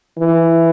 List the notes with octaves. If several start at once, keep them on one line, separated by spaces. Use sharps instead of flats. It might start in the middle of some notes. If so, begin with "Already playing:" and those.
E3